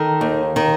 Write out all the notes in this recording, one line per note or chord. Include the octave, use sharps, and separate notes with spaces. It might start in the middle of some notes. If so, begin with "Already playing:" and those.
Already playing: D#3 A4
D#2
D#3